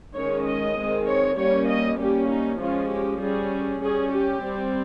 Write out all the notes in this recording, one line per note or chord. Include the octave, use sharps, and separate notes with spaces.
D#3 G#3 C#4 C#5
D#5
D#3 G#3 C4
C#5
G3 A#3 C#4 C#5
D#5
G3 A#3 C#4 G4
D#4
F3 G#3 C#4 F4
G4
G3 C#4 G#4
G3 C#4 G#4
G4
G3 C4